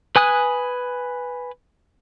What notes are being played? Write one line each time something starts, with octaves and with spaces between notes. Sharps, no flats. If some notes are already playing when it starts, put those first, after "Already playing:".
B4 G#5 D#6 F#6